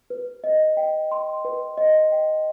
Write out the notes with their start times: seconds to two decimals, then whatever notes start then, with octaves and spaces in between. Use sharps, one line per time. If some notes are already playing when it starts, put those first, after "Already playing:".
0.10 B4
0.44 D#5
0.77 G5
1.12 C6
1.45 B4
1.77 D#5
2.12 G5